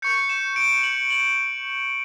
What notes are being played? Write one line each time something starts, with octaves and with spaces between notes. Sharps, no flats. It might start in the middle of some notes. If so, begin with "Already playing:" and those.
C#6 G6 C#7
E7
D7
F#7
F#7